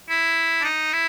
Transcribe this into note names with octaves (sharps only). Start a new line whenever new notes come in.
E4
D4
D#4
E4